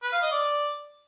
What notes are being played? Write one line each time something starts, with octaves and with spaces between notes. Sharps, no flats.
B4
F5
D#5
D5